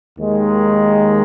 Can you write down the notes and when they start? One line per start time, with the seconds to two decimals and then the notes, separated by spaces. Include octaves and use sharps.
0.18 D#2 D#3 G#3